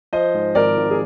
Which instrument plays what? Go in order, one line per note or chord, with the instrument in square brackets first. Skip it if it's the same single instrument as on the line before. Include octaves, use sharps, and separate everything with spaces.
[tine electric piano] F3 [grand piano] C5 D#5
[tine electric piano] G#2
[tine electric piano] G#1 [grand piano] A#4 D5
[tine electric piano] G#1
[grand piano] G#4